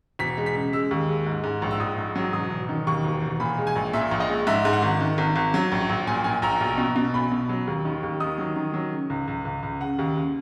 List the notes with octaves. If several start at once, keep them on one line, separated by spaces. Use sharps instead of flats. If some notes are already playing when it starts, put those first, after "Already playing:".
E1 B6
G#3
B6
C#3
G#3 E6
D#2
G#3
G#2
G#2
A#1
E6
A#1 D#6
G#2
F#3
E1 D#6
E1
D#3
D#2 C#6
E1
E1
A#2 B5
G#3
G#5
A#1
A#2 E5
A#1
D#5
G#3
G#2 E5
G#2
F#5
G#1
D#3
G#1
G#1
F#3
A#1
A#1
A#2 G#5
A#2 G#5
A#1 A#5
B1
B2
B2
B1 B5
B2
F#3
D#2
D#3
D#2
D#3 D#6
F#3
D#3
F#3
C#3
C#2
C#2
C#2
C#2
C#3 F#5
D#2
C#3